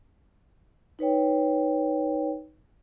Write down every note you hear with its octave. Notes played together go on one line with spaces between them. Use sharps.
D#4 B4 C#5 G5